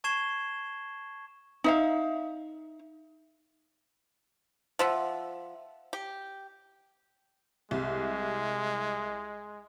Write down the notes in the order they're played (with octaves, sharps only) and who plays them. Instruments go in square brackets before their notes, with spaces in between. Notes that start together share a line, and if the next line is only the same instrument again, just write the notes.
[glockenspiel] A5 C#6 G#6 C7 E7 G7
[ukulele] D#4 E5 F5
[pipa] F3 E5 F#5
G4
[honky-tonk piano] C2 [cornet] G#3